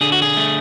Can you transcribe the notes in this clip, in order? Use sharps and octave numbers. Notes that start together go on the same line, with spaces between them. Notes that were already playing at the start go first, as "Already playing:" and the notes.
D3 G#4
F#4
G#4
A3